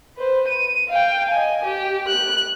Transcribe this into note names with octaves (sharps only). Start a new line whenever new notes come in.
B4 C5
D#7
F5 G5
D#5 G#5
G4
F#6